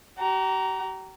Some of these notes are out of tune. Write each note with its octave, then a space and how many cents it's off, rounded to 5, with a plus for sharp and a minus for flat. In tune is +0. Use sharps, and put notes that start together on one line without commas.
G4 -45 A#5 +0